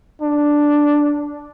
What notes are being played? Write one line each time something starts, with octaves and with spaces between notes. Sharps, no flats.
D4